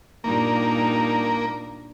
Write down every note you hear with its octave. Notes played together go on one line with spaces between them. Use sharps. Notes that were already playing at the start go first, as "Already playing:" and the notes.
G2 A#2 A#3 D#4